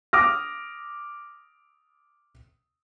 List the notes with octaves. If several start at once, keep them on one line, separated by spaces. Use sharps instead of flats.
D6 D#6 F6 A#6